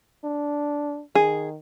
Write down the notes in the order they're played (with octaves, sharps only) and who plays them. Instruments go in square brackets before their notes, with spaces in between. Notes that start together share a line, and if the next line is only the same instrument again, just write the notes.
[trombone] D4
[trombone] D#3 [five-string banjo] G#4